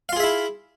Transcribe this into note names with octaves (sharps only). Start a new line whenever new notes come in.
E4 F4 G#4 E5 F5